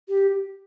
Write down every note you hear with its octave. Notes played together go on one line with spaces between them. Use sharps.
G4